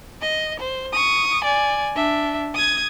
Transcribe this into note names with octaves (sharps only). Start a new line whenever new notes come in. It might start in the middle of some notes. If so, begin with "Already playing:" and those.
D#5
C5
C#6 D#6
D5 G#5
D4 E5
D#6 G#6